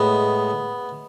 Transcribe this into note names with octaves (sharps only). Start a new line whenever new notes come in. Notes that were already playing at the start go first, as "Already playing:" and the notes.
Already playing: A2 G#3 B3